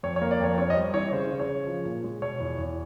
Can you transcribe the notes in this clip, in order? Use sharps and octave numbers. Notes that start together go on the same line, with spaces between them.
F2 C#5
C#5
A#3
D5
F2 C#5
C4 C#5
D#5
G3 D5
E3 C#5
C#3 C5
C#3
C#5
C#3
F3
A#2
G#3
B2 C#5
E2
E2